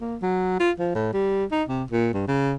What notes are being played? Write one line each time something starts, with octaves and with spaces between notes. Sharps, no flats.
A#3
F#3
F4
F3
A2
G3
D#4
C3
A#2
G2
C#3